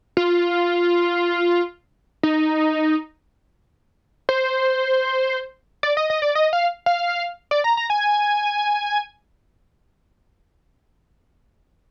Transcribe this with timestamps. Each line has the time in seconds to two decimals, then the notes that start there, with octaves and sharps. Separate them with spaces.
0.17 F4
2.23 D#4
4.29 C5
5.83 D5
5.97 D#5
6.10 D#5
6.22 D5
6.35 D#5
6.53 F5
6.86 F5
7.51 D5
7.64 A#5
7.77 A#5
7.90 G#5